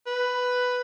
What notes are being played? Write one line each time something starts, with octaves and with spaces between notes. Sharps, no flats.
B4